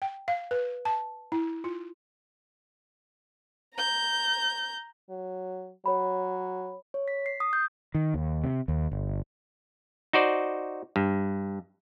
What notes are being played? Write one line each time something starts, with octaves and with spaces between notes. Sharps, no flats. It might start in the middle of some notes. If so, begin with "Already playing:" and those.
G5
F5
B4
A5
E4
F4
A#5 G6
F#3
F#3 C#5 B5
C#5
B6
C7
D#6
G6
D#3
D#2
C3
D#2
G1
D#4 F#4 C5 D5
G2